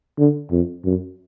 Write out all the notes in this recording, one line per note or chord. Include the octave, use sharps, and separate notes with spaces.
D3
F2
F#2